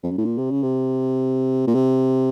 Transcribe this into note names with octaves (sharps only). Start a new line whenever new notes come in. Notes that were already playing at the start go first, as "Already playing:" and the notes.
F2
F#2
A2
A#2
C3
C#3
C3
A#2
C3